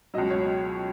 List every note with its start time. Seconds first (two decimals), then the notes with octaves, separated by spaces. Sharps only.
0.14 C#2 B2 F#3 D#5
0.30 C#5